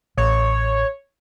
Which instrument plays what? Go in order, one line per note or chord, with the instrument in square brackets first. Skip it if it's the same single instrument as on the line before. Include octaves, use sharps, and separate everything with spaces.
[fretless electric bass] A1 [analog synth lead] C#5